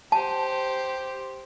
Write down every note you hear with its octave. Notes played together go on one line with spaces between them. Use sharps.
G4 C5 A5